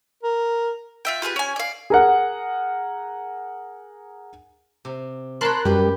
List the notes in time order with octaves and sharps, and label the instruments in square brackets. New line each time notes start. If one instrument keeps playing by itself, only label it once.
[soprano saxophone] A#4
[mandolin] F4 E5 G5
F4 G4 G#4 B4
C#4 G#5
D5 F5
[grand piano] G#4 A#4 F#5
[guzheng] C3
[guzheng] A#4 C#5 B5 [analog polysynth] A5 C6 F#6
[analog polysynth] F#2 [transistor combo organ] G3 [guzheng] G4 B4